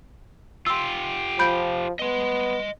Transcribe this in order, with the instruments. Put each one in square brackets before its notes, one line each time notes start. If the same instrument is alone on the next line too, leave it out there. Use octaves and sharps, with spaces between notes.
[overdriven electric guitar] F4 G4 [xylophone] C6 E6
[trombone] F3 [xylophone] B5 G6 D7
[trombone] B3 [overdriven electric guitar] D#5 C6